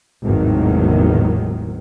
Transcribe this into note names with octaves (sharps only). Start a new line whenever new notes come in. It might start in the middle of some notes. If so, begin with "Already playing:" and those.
G#1 E2 A2 C3 D#3 F#3